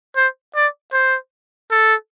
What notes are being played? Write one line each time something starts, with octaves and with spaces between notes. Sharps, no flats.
C5
D5
C5
A4